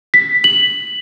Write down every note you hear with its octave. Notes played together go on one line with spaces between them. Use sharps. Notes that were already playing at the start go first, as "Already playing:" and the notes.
B6
F#7